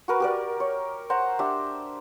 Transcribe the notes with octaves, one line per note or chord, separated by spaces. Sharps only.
F#4 A#4 B4
G4 A#4 D5
C#5
C5 F#5 A#5
D4 G4 E5